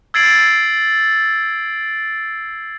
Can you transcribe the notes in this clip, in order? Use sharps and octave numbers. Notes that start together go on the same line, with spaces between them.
E6 G#6 A6 C7 D7 F#7